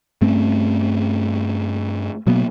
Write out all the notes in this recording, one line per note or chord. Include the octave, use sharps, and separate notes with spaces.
G2 A3 C4 C#4
B2 F#3 A#3 B3